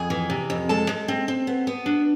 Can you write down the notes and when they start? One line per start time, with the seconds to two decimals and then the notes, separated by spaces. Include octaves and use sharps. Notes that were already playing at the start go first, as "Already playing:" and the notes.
Already playing: F2 G#4 G#5
0.10 E3
0.30 C3
0.50 F2
0.69 G#3 A4 A5
0.89 G#3
1.08 C4
1.28 C4
1.47 B3
1.67 B3
1.86 D4